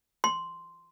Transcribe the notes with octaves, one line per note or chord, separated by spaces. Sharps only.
C6